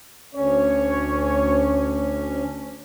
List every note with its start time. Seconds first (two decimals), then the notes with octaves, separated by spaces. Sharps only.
0.35 D2 C#4 C#5